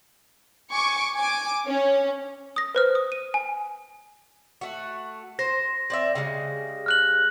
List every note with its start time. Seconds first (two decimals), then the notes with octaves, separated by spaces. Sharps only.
0.71 G#5 C#6 D6
1.16 G#5 D6
1.66 C#4
2.56 D#6 A#6
2.75 B4 C5 F6
2.95 D#6
3.12 D#7
3.34 G#5
4.61 A3 F#4
5.39 C5 A#6
5.90 C4 D5 E5
6.15 C#3 G3 G#3
6.86 F6 F#6 F#7